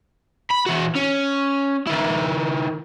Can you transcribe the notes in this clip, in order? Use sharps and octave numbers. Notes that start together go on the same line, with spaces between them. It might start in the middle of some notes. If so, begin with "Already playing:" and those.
B5
E3 F#4
C#4
D#3 E4